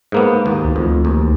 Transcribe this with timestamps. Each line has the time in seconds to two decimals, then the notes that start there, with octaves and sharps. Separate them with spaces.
0.12 G#2 A#3 B3
0.46 D#2
0.64 D2
0.76 F2
1.05 D#2